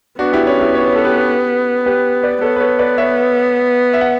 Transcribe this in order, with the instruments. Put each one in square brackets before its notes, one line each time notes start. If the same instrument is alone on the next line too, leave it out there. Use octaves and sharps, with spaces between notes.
[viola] B3 [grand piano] D4 F#4
[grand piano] E4 G4
C#4 E4
E4 G4
C#5
B4
A4
G4 B4
G4 B4
B4 D5
[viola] B3 [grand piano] A4 C#5
[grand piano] B4
A4 C#5
B4 D5
C#5 E5
E5
F#5